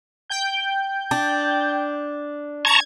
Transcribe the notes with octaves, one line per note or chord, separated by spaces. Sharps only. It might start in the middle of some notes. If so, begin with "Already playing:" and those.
G5 G6
D4
A5 A#5 C#6 G#6